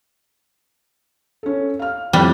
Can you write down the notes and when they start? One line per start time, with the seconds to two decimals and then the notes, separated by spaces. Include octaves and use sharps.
1.43 C#4 A4
1.79 F5 F6
2.13 F2 A2 G3 F#6